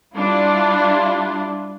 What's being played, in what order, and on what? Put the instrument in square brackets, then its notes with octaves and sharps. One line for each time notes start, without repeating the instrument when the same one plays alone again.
[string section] G3 D4 E4 F4